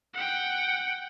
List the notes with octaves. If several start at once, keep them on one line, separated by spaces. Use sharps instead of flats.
F#5 G5